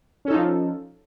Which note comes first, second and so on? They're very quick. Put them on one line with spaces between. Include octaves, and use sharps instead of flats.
C#4 A4 D#4 F4 F3